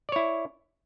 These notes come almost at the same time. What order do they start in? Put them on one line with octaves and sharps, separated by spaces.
D5 C#5 E4